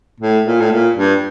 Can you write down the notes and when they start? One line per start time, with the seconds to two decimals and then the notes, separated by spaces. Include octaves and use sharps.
0.20 A2
0.46 A#2
0.61 A2
0.72 A#2
0.96 G2